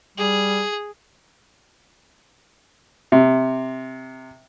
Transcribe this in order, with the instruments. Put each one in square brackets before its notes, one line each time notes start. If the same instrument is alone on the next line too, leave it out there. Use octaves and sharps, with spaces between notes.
[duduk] G3 [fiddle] G#4
[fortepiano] C3